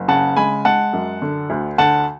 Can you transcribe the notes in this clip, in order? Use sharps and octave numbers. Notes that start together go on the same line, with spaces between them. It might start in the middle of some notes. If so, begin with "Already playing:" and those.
Already playing: F#1
C#3 F#5 A5
G#3 G#5 B5
G#3 F#5 A5
F#2
D3
D2
D3 F#5 A5